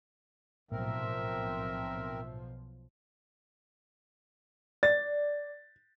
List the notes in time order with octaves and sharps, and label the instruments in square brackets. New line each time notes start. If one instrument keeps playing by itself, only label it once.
[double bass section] B1 F3 [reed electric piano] A2 [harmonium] C4 A#4 [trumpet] E5
[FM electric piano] D5 [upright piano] A6